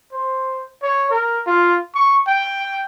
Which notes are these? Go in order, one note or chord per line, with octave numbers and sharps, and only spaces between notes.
C5
C#5
A#4
F4
C#6
G5